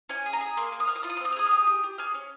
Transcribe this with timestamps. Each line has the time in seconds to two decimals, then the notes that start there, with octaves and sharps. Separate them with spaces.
0.09 C#4 G#5
0.26 G#4
0.33 A#5
0.41 G#4
0.57 A#3 C6
0.72 A#3
0.80 D#6
0.87 A#3 F6
0.96 D#6
1.03 F4 F6
1.10 D#6
1.17 F6
1.20 C4 D#6
1.32 F6
1.36 G#4 D#6
1.46 F6
1.51 G4 D#6
1.67 G4
1.84 G4
1.98 G#4 F6
2.14 C#4